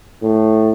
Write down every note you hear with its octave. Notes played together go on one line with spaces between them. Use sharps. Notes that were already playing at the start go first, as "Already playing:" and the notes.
A2